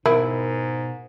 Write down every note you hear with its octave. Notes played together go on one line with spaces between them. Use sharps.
G#2 B2 E4 A#4